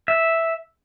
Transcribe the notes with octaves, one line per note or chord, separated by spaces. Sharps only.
E5